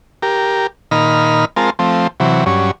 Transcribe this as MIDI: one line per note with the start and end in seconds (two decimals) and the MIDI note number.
0.22 0.67 67
0.22 0.67 70
0.91 1.45 46
0.91 1.45 51
0.91 1.45 63
0.91 1.45 83
0.91 1.45 89
1.57 1.70 56
1.57 1.70 60
1.57 1.70 65
1.57 1.70 70
1.57 1.70 81
1.79 2.07 53
1.79 2.07 57
1.79 2.07 60
2.20 2.44 48
2.20 2.44 52
2.20 2.44 54
2.46 2.71 43
2.46 2.71 54
2.46 2.71 61